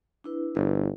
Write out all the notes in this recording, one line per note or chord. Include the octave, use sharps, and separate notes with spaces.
D4 E4 B4
G1